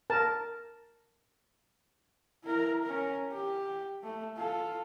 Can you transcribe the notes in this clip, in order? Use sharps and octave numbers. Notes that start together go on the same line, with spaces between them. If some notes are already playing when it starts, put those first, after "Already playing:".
A#4 A5
E4 A#4
C#4 A#4
G4
A3
F4 A4